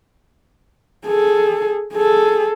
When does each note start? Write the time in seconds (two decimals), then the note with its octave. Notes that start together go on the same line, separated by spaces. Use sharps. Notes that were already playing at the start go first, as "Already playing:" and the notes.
1.06 G#4 A4
1.94 G#4 A4